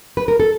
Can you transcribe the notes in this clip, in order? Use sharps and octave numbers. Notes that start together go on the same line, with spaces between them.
B4
A#4
A4